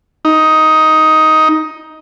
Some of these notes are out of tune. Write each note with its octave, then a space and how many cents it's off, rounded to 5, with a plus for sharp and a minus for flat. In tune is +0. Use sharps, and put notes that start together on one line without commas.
D#4 +10